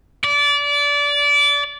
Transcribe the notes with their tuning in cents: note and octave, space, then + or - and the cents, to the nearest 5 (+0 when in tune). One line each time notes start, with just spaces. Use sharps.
D5 -25